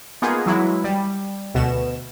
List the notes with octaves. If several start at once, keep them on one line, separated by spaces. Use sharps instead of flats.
A#3 B3 D#4 F4 G#4
E3 F#3 G#3 E4
G3
D2 B2 E7